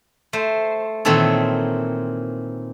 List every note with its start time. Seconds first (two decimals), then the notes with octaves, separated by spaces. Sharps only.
0.33 A3 C5
1.05 A#2 D#3 E3 C4 A4 C#5